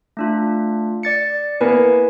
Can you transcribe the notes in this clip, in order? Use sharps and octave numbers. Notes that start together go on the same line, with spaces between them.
A3 D4 F4
D5 A6 C#7
A#3 B3 E4 B4 G#5